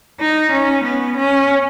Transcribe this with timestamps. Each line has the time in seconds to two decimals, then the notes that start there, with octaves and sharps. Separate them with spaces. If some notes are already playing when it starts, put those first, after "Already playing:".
0.20 D#4
0.52 C#4
0.84 B3
1.17 C#4